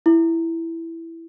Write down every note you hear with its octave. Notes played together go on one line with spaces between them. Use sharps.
E4